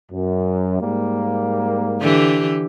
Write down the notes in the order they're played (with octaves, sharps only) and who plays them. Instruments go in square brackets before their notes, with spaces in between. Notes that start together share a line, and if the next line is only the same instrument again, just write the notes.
[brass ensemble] F#2
G#2 G3 A#3
[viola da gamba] D3 E3 G4